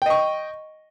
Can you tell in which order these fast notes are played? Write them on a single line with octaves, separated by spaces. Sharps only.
G5 D#5 C#6